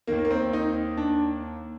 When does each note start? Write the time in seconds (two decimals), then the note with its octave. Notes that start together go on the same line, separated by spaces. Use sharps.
0.07 D#2 D#3 A#3
0.25 A#3
0.31 C4
0.53 D#4
0.97 D4